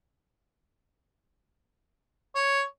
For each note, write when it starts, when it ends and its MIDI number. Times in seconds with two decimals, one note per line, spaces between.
2.35 2.61 73